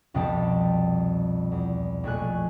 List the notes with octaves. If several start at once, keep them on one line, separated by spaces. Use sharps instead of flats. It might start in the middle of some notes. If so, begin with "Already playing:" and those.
C2 F2 B2 G3 G4 A5
E2
A#1 F2 A3 G#5 F#6